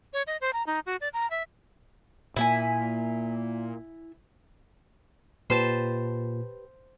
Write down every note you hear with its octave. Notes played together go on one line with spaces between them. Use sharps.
C#5
D#5
C5
A#5
D#4
F#4
D5
A#5
E5
A#2 A#3 E4 E5 G#5
A#2 G4 B4 C5 A5